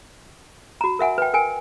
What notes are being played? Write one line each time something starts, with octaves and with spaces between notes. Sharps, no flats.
F#4 A#5
A#4 E5 F#5 G#5
B4 G5
A#4 G5 G#5